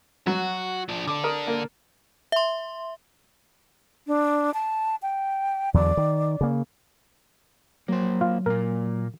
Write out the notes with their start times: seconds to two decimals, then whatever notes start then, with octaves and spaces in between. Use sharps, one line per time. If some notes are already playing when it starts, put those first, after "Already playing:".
0.27 F#3 F#4
0.89 F3 D4
1.08 D3 D4 D6
1.24 A#4 D#6
1.47 A#3
2.32 E5 C6
4.07 D4
4.54 A5
5.02 G5
5.74 E2 D3 F#3 D5
5.97 D#3
6.41 C#3 A#3
7.88 F#3 A#3 C5
8.21 F4
8.46 A#2 A#3 A#4